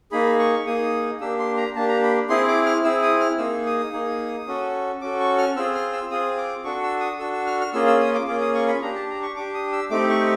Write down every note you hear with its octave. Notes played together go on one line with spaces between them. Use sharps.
A#3 D#4 G#4 B5
C#6
A#3 D#4 G#4 D#6
A#3 D4 G4 E6
C6
A#5
A#3 D4 G4 A5
A#5
B5
C4 E4 G#4 C6
D6
F6
C4 E4 G#4 E6
D#6
F6
A#3 D#4 G#4 E6
D#6
A#3 D#4 G#4
C#4 F#4 A4
C#4 F#4 A4 D6
C#6
F6
C4 F4 G#4 E6
F6
E6
C4 F4 G#4 D#6
D6
D4 F#4 A4 C#6
E6
D#6
D4 F#4 A4 E6
E6
F6
F6
A#3 C#4 F4 G#4 E6
E6
D#6
D6
A#3 C#4 F4 G#4 D6
D#6
C#6
B5
D4 G4 A#5
A5
A#5
C#6
D4 G4 D6
D#6
E6
A3 C4 D#4 G4 D6
C#6